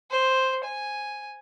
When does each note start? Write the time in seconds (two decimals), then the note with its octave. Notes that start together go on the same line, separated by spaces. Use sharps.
0.11 C5
0.64 G#5